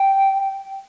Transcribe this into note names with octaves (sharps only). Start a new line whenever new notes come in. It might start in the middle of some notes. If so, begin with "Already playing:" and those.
Already playing: G5